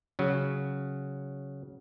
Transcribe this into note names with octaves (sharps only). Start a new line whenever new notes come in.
C#3 F#3